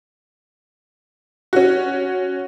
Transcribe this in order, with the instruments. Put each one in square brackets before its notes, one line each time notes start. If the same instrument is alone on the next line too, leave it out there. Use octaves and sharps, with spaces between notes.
[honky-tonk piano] C#4 F#4